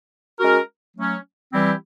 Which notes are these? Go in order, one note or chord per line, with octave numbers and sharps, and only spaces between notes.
G#3 C#4 F#4 A#4
F#3 A3 C#4
E3 G3 C4 E4 G4